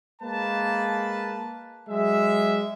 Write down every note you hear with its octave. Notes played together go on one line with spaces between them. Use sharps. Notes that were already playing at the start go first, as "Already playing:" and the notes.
G#3 A#3 B4 A5
F#3 G#3 E5